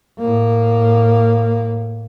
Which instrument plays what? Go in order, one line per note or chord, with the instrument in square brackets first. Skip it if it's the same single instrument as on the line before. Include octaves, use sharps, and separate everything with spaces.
[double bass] A2 A#3